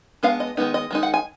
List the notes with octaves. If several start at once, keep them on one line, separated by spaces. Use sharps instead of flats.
G#3 B3 D4 F5
D#5
D#3 G#3 B3 D#4
D#5
D#3 G#3 D#4
F#5
G#5